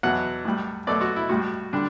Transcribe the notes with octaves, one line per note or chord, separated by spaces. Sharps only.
E2 B2 F#3 F#5
A2 G3
B2 F#3 A3 D5
F#4
E4
A2 G3 F#4
D3 G3 D4